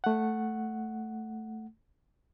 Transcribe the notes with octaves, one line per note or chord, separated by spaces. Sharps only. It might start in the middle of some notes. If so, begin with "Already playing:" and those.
A3 F#5